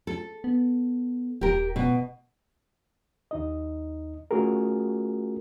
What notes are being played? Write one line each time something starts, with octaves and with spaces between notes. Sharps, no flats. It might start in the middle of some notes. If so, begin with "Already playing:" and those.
A4
B3
D#1 G4 A#4
B2
D#2 D#4 D#5
A3 C#4 F4 F#4 G#4 A#4